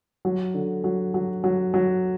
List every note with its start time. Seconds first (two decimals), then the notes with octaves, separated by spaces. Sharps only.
0.25 F#3
0.54 D3
0.84 F#3
1.14 F#3
1.44 F#3
1.74 F#3